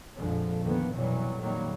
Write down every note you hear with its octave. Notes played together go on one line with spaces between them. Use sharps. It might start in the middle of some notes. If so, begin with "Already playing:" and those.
A#1 F2 A#2 D3 F3 G#3
F2 D3 D#3 F3 A#3 B3
C2 F#2 B2 E3 F#3 G3
F2 A#2 D#3 F#3 G3 A#3